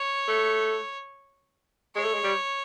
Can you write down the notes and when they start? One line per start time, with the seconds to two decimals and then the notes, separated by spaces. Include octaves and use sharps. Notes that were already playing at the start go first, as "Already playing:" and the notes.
Already playing: C#5
0.27 A3
1.95 G#3 C#5
2.04 A3
2.13 G#3
2.23 G3